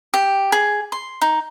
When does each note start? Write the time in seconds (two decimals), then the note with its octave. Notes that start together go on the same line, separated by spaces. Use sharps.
0.14 G4
0.52 G#4
0.92 C6
1.21 D#4